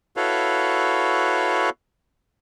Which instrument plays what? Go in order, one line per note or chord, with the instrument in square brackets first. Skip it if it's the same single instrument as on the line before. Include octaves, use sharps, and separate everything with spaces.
[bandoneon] E4 F#4 A4 B4 C#5 F5